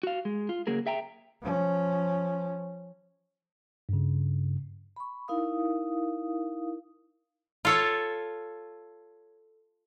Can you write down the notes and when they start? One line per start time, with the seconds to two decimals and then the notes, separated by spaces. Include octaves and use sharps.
0.03 F#4 F5
0.25 G#3
0.49 F4
0.67 C#3 F#3 A#3 G#4 A#4
0.86 G#4 E5 G5 A#5
1.41 F3 C#4
3.89 G2 C#3
4.96 B5 C#6
5.28 D#4 E4 A#4 F5 D#6
7.65 F4 A4 C#5